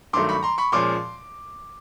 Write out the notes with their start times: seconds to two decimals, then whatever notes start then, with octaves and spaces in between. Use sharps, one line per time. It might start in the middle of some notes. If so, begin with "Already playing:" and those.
0.13 G2 D#3 F#3 A3 C6 D6
0.29 B5 C#6
0.43 A#5 C6
0.58 B5 C#6
0.72 A#2 F3 G#3 C#4 C6 D6